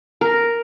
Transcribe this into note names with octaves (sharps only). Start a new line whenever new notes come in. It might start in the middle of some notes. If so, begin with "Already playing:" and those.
A#4